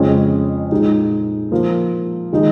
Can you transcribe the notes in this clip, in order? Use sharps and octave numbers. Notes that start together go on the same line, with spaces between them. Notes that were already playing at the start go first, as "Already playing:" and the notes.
Already playing: F2 C#3 G#3 C#4
A#2 G#3 D#4
F3 A#3 F4
D#3 G#3 D#4